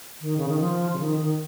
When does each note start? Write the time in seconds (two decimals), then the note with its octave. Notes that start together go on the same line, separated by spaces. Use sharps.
0.21 D#3
0.37 C#3
0.49 D#3
0.60 F3
0.93 C#3
1.00 D#3
1.19 D#3